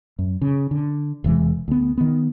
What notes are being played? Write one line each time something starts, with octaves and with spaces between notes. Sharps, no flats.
F#2
C#3
D3
E1 C3 E3 G#3
D2 B3
D#3 B3